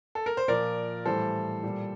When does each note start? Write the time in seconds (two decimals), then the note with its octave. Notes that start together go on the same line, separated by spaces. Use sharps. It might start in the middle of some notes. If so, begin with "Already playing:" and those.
0.15 A4
0.26 A#4
0.37 C5
0.48 A#2 F3 A#4 D5
1.06 A2 E3 G3 A4 C5
1.63 A#2 G3